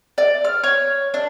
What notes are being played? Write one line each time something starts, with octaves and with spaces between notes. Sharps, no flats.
D5
F6
C#5
D4